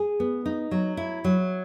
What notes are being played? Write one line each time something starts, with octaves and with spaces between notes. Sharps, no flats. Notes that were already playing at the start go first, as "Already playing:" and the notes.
Already playing: G#4
B3
D#4
F#3
E4
F#3